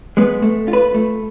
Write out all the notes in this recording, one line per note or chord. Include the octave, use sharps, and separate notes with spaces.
G#3 B3
A3
F4
B4
A3